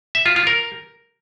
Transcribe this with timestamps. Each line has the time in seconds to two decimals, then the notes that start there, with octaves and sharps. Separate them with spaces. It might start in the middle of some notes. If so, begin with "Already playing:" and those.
0.15 E5
0.26 F4
0.36 F4
0.47 A#4